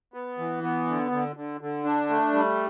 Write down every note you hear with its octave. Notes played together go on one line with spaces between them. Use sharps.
B3
E3
B3
D3
D3
D3
D3
D4
A3
G3